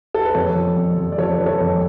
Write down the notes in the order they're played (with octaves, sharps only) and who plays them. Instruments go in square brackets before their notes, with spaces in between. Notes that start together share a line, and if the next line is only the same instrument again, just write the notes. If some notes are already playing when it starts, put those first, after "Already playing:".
[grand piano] A4
B4
F2 A4 C#5
F3
F2
F2
D5
F3 A4 C#5
F3 B4
A4 C#5
F2